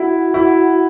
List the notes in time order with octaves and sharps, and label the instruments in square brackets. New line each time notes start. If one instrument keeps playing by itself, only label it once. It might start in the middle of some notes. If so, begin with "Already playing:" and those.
Already playing: [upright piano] E4 [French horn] F#4
[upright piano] E4